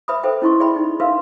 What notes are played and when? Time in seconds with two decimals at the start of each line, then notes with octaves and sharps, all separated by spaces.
0.08 B4 E5 B5 D#6
0.23 A4 C5 E5 G5
0.42 C#4 E4 D#5 C6 C#6
0.60 G#4 D5 E5 G5 B5
0.76 D#4
1.00 D4 A#4 B4 E5 F5 C6